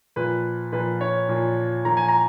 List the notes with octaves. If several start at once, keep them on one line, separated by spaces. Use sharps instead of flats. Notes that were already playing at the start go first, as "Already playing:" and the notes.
A#2 F3 B4
A#2 F3 B4
C#5
A#2 F3
A#2 F3 A#5
G#5
A#5